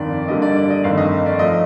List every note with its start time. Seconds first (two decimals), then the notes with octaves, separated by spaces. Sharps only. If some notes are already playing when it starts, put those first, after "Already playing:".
Already playing: G1 F2 D#3 D5
0.28 G2 D3 G3 A#3 D#5
0.42 D5
0.57 D5
0.70 D#5
0.84 G1 F2 D#3 A3 F5
0.98 D#5
1.26 D5
1.39 F3 A3 D#5